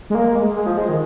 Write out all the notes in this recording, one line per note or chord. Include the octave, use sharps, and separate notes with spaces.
G#3
A#3
G#3
G#3
F3
G#3
D#3